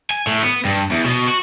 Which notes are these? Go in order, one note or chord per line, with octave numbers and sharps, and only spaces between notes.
G#5
A2
B3
G2
E2
B2
F#4